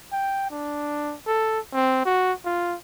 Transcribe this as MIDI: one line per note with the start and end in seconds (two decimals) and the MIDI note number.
0.12 0.49 79
0.50 1.15 62
1.27 1.59 69
1.73 2.02 60
2.05 2.33 66
2.45 2.76 65